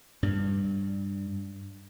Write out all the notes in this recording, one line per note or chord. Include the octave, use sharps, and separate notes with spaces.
G2 G3